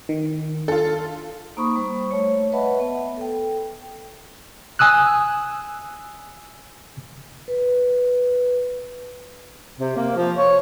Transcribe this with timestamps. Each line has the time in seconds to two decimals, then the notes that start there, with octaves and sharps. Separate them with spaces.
0.09 D#3
0.68 F4 A4
1.57 A#3 D#4 C5 B5 C#6 D#6
1.76 G3 C5 C#6
2.11 A3 C#5
2.52 B4 D#5 E5 F#5 A5 B5
2.80 B3
3.17 A4 G5
4.79 G#5 D#6 E6 F#6
7.48 B4
9.79 C3
9.96 A#3
10.16 F3
10.36 C#5